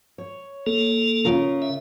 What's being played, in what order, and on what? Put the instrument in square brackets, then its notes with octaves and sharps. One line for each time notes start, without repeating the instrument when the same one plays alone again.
[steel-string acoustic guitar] C#5
[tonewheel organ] A#3 A4
[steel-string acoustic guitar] C#3 F4 A#4
[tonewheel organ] E5